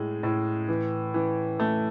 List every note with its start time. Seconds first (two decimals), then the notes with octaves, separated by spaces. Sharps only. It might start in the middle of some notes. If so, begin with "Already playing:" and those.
Already playing: A2 G#3
0.23 A2
0.68 E3
1.14 E3
1.60 A3